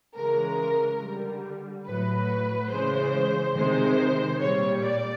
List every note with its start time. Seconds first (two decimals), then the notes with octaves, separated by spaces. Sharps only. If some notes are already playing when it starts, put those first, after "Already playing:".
0.15 C#3 E3 G#3 A#4
1.01 D3 G3
1.85 A2 F#3 B4
2.70 C#3 E3 G#3 C5
3.55 C3 D#3 G#3 C5
4.40 A#2 G3 C#5
4.84 D5